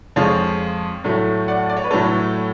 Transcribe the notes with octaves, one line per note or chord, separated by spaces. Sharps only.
F2 F3 G#3 C#5 F5
A2 F#3 A3
D5 F#5
D5
C#5
B4
A2 F#3 A3 A4 C#5